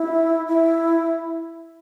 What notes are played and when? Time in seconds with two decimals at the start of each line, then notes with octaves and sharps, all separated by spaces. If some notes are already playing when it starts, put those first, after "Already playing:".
Already playing: E4
0.48 E4